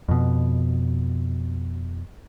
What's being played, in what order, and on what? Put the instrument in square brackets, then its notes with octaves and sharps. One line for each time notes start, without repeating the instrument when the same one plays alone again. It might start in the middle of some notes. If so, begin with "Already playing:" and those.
[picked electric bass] F2 B2